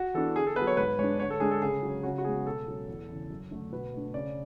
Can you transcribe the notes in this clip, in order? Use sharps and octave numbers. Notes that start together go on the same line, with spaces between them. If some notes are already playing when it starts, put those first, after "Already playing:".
Already playing: F#4
E3 B3 D4 A4
D3 G#4
A4
B3 B4
F#3
C#5
G#2 B4
G#3 D4 C#5
D3 C#5
A4
G#3 D4 G#4
A4
C#3 G#4
F#3 C#4
C#3 F#4
F#4
G#3 B3 G#4
B2 A4
F#3 C#4
E2
C#3 E3
F#2
D3 A3 D4
B2 B4
A3 D4
C#3 D5